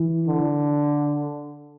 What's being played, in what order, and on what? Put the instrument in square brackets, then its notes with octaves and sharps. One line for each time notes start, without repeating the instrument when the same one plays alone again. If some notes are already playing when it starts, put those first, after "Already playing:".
Already playing: [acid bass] E3
[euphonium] D3